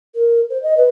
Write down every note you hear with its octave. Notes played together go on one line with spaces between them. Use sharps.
A#4
C5
D#5
B4